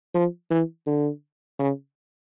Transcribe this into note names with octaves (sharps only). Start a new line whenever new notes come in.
F3
E3
D3
C#3